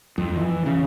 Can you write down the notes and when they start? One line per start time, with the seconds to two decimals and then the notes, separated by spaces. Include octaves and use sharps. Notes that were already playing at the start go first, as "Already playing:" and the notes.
0.18 F2
0.36 E3
0.66 C#3